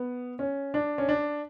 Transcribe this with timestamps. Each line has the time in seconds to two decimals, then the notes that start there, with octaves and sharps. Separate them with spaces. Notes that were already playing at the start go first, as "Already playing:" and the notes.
Already playing: B3
0.39 C#4
0.74 D4
0.98 C#4
1.09 D4